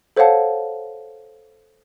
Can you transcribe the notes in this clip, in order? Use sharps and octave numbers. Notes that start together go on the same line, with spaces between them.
A4 C5 C#5 F5 F#5 A5